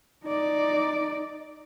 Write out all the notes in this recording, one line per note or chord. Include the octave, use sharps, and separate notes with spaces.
D#4 D5